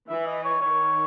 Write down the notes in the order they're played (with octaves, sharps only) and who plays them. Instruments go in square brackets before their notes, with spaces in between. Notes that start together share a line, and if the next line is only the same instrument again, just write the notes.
[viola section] E3 [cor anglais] E5
[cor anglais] D#5
C#5
[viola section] D#3 [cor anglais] C#5